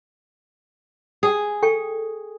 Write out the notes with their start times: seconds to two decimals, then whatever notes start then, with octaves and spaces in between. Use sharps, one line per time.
1.23 G#4
1.63 A4 G5 C#6